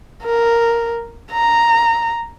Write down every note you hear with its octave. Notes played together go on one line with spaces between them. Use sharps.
A#4
A#5